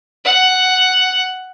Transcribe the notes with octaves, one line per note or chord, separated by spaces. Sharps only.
F#5